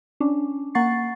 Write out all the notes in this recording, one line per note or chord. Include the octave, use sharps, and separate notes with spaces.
C#4 D4
A#3 F#5 C#6 A6 C7